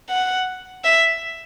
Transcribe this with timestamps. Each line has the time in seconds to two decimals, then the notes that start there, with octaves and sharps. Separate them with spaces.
0.10 F#5
0.85 E5